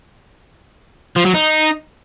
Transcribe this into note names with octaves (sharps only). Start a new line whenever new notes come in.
F3
F#3
D#4